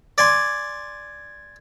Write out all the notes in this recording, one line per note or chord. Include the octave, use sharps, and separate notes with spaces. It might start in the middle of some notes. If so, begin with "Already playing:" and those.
D5 G#5 C6